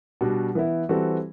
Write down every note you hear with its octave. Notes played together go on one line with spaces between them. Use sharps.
B2 G3 D4 F#4
E3 B3 E4
E3 G3 C4 F#4 A4